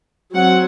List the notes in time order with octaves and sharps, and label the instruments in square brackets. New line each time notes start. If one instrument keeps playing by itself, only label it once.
[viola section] F#3 C4 F#5